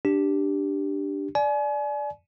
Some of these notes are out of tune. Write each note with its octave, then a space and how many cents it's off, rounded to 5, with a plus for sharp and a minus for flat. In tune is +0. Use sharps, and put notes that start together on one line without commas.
D4 +0 G4 +0
D5 +0 G#5 +35